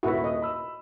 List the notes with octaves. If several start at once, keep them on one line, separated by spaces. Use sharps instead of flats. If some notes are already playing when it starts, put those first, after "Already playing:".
D#1 E4 F#4 A#4 B4
D#5
B5 E6